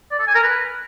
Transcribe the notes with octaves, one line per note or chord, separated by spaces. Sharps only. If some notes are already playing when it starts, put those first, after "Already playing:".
D5
A4
G#5
A#4
B4